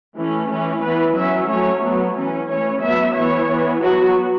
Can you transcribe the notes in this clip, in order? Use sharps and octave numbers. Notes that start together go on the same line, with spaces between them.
E3 A3 C#4
E3 C#4
E3 B3 B4
F#3 C#4 E5
F#3 A3 C#4 C#5
F#3 B3
E3 C#4
E3 A3 C#4 C#5
F#3 B3 E5
E3 B3 C#5
E3 B3
F#3 B3 F#4